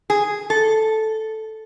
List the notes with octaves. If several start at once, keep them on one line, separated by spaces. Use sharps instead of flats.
G#4
A4